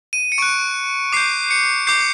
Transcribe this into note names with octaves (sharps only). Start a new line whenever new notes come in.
D#7
C#7
C#6 F#6 D7
D6 G6 C7
C#7
D6 G6 C7